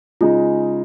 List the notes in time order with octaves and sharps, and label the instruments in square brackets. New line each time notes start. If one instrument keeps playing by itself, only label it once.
[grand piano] C#3 G#3 D#4 [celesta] F4